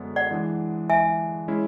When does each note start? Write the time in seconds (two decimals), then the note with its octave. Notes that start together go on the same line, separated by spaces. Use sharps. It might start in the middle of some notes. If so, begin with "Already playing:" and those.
Already playing: F#2 D3 G#3 B3
0.16 D5 F#5
0.31 E3 G#3 D4
0.90 E5 G#5
1.48 G#3 C#4 E4